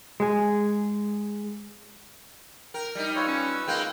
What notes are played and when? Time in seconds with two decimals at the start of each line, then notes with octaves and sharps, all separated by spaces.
0.20 G#3 G#4
2.74 A#4 G5
2.95 G3 D#4
3.16 F4 B4 C#5 E6
3.27 C#4
3.67 G#3 A#3 G5